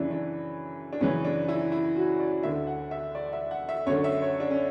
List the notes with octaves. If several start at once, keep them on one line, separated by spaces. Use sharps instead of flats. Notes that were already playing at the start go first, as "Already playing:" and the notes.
Already playing: F#2 C#3 E3 D4 E4
D4
D4
F#2 C#3 E3 C#4
D4
E4
E4
F#4
D5
D2 D3 E5
F#5
E5
D5
E5
F#5
E5
F#2 D3 C#5
E5
C#5
D4
C#4